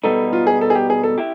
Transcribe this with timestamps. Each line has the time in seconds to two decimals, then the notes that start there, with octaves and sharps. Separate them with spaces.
0.04 B2 G3 B3 D#4 A4
0.33 F4
0.47 G#4
0.61 A4
0.70 G#4
0.75 G4
0.90 G#4
1.03 A4
1.18 E4 G4